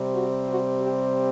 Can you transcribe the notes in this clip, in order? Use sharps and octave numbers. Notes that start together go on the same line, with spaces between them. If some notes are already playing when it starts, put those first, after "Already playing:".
Already playing: C3 G3 C4
F#4
F#4
G4